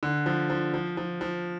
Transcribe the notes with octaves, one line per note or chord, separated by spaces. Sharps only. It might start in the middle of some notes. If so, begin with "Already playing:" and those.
D3
F3
F3
F3
F3
F3